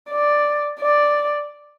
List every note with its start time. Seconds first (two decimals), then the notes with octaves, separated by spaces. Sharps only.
0.10 D5
0.81 D5